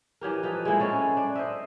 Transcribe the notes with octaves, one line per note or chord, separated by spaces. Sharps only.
E3 F#3 G4 A#4
F3 D#4 A4 B4
G#3 A#3 E4
F#3 C4 C#4 A4
D4
C5 D#5 E5